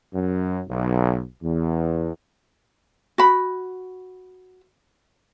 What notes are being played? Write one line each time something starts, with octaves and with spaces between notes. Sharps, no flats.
F#2
B1
E2
F#4 B5